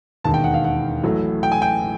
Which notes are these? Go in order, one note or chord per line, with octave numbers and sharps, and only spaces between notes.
E1 D#2 D#3 A5
G5
F#5
F5
F#5
A1 A2 F#3 A3
G5
G#5
G5